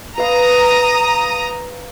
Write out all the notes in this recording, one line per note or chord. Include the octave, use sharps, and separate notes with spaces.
B4 F5 A#5 D#6